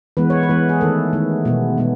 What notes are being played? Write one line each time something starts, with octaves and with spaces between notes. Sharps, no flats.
E3 G#3 B3 B4
C#5
B4
E3 G#3 B3
G#4
D#3 A3 A4
D#3 A3
B2 G#3 B3
B2 G#3 B3